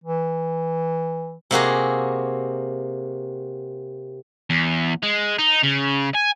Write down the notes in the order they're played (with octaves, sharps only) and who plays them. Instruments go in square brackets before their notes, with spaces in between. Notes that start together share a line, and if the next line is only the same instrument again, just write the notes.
[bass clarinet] E3
[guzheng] C3 A#3 F#4 G#4
[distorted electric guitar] E2
G#3
D#4
C#3
G#5